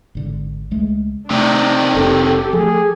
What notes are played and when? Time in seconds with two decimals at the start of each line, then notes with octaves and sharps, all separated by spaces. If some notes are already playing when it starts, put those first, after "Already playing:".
0.15 G#1 D3
0.71 C#2 G#3 A3
1.31 C3 D#3 A3 D4
1.95 F1 D4 G4 A4
2.53 F3 A3 G#4